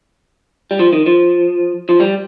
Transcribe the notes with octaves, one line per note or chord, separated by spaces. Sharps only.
G3
F3
D#3
F3
F3
G3